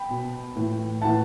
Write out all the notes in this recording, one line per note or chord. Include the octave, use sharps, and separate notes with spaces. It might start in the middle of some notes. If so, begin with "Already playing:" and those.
Already playing: G5 B5
B2
A2 E3
A2 E3 F#5 A5